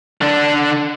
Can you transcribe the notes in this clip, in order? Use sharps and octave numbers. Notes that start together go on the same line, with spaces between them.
D3 D4